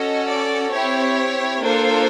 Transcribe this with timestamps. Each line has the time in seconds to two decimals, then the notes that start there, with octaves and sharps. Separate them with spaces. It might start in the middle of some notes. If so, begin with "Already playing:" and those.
Already playing: C#4 F#4 A4 D#5
0.26 D5
0.71 C4 E4 G4 C#5
1.62 A#3 D4 F4 A4 C5